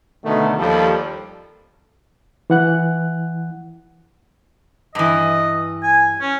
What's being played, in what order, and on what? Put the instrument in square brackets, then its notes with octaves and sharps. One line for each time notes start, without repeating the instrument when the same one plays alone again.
[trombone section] B2 D3 D#3 A3
D#2 F3 G3 A4
[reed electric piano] E3 F#5 F#6
[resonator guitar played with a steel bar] G2 E3 [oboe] D#5
[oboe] G#5
C#4